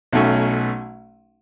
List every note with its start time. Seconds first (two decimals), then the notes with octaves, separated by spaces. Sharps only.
0.12 B1 B2 F#3 A3 C#4